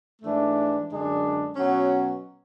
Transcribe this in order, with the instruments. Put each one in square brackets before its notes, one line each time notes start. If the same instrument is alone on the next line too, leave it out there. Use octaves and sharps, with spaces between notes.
[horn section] G#2 E3 A3 D4
F#2 D3 G#3 D4
B2 F#3 C#4 F#4